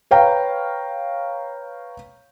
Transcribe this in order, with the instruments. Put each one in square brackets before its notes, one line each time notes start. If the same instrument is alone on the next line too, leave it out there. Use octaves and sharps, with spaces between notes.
[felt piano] B4 C#5 F5 G5 A#5